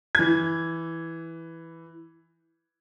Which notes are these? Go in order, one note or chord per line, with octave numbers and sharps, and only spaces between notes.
E3 G#6